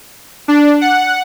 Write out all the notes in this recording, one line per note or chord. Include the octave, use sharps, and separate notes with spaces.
D4
F#5